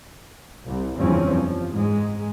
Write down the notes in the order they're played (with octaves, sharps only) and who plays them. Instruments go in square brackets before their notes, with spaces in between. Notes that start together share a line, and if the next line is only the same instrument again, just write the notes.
[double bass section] C2
F#1 E2 G2 F3 C4 C#4
F3
G#2 G#3